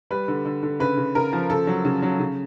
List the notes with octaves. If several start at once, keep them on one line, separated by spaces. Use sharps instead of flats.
G3 B4
D3
D3
D3
C#3 B4
C#3
C#3 A#4
F3
C#3 A4
F#3
C#3
F#3
C#3